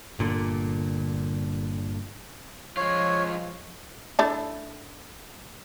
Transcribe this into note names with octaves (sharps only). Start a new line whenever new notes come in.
G1 A#2 D3
F3 G#3 F4 C#5
A3 D4 E4